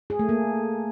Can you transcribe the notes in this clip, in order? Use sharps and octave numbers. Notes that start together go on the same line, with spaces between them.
G#4
A3
A#3